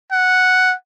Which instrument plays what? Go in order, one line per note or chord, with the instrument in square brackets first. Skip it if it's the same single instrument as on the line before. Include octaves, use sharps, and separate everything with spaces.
[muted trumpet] F#5